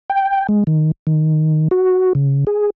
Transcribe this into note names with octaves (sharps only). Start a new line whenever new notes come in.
G5
G#3
D#3
D#3
F#4
C#3
G#4